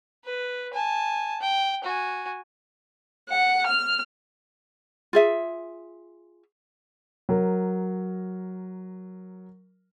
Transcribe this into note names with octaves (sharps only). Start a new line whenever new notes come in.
B4
G#5 A5
G5
F#4 G#5
F#5
F6
F4 G#4 E5
F#3 A#4